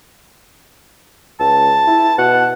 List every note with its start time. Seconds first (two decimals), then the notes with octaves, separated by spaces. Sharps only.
1.40 C#2 A5
1.87 E4
2.18 B2 F#5